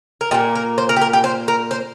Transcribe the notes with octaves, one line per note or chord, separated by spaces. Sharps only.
A#4
A#2 A#3 G4
A#4
C5
A#4
G4
A#4
G4
C5
A#4
C5